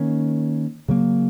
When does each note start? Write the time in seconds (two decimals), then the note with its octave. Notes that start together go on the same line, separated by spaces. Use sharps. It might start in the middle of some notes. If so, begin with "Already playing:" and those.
Already playing: D#3 A#3 C#4
0.88 C#3 F#3 A#3